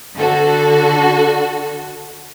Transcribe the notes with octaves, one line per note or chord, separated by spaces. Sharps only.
D3 F#4 A4